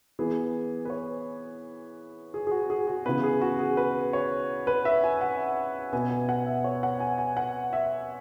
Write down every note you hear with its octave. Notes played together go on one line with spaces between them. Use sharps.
E3 B3 G#4
B4
C#5
G#4
G#4
F#4
G#4
F#4
C#3 E3 B3 B4
G#4
F#4
G#4
B4
C#5
B4
E5
G#5
F#5
B2 B3 G#5
G#5
F#5
E5
C#5
F#5
G#5
G#5
F#5
E5